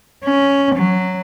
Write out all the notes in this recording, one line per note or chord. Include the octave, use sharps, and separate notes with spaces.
C#4
F#3